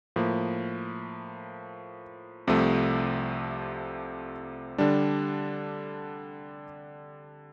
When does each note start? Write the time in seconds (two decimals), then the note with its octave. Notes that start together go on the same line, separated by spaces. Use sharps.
0.16 A2 F3 A#3
2.47 C2 C3 F3 A3
4.78 D3 G3 D4